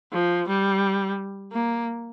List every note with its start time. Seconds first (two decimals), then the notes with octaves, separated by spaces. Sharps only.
0.13 F3
0.48 G3
1.53 A#3